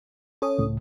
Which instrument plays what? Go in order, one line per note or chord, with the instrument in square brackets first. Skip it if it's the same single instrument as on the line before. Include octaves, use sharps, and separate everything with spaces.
[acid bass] C#4 [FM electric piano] A4 C#5 D#6
[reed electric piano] C#2 A2